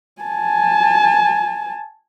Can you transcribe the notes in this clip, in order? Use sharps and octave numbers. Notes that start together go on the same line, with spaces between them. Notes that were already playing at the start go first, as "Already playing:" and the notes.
G#5 A5